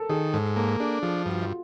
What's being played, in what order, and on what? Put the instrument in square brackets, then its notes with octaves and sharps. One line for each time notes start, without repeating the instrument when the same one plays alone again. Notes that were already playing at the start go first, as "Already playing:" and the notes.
Already playing: [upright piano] A4 A#4
[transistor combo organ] D#3 [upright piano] G#4
[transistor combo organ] G#2 [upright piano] A4
[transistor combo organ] A#3 [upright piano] A4
[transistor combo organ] D4 [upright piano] G#4
[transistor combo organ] F3 [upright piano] G#4
[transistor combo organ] G2 [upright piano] F#4
[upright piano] F4